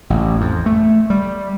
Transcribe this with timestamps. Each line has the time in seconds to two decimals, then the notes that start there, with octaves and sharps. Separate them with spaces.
0.10 A1
0.41 F2
0.66 A3
1.10 G3